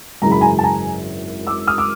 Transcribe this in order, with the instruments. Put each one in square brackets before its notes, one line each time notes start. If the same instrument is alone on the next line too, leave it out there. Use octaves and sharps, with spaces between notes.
[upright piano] G#1 F#2 C#3 E3 G#3 A#5
B5
G#5 A#5
A5
G#5 A#5
D6 E6
D#6 F6
D6 E6